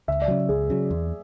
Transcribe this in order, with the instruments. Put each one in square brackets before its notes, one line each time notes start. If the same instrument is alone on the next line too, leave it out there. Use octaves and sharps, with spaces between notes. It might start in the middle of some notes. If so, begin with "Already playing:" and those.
[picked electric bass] C#2 [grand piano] E5
[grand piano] D5
[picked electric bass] C#3 F#3
[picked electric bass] C#2 [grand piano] G#4
[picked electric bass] C#3 F#3
E2